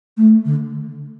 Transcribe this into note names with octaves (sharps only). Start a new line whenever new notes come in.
A3
D3